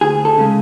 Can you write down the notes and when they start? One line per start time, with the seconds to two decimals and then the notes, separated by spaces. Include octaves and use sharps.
0.01 D2 G#4
0.25 A4
0.38 C#3 G#3